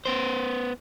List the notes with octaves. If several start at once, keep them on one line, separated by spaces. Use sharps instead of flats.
B3 C5